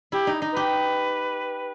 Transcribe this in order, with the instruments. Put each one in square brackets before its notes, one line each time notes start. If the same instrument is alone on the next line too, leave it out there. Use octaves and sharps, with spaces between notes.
[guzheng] E4 [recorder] G4
[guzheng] D#4
D#4
[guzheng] G4 [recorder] B4